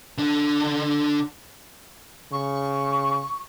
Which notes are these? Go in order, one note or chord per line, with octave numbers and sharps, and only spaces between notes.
D3 D4
C#3 C#6